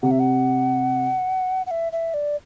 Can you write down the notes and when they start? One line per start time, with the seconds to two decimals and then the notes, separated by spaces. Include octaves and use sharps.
0.03 C3 F#5
0.11 E5
0.20 F#5
1.66 F#5
1.71 E5
1.92 E5
2.14 D5